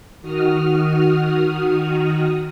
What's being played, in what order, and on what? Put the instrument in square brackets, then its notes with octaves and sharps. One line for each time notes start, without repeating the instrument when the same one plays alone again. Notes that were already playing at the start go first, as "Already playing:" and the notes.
[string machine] D#3 F#4 D#6 F6